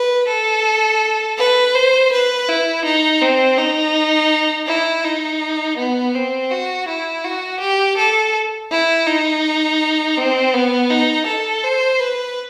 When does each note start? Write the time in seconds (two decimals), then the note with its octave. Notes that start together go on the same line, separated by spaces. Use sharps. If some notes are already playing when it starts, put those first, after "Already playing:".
Already playing: B4
0.28 A4
1.38 B4
1.74 C5
2.12 B4
2.48 E4
2.85 D#4
3.21 C4
3.58 D#4
4.68 E4
5.04 D#4
5.78 B3
6.15 C4
6.50 F#4
6.88 E4
7.24 F#4
7.60 G4
7.98 A4
8.71 E4
9.07 D#4
10.18 C4
10.54 B3
10.91 D#4
11.27 A4
11.64 C5
12.00 B4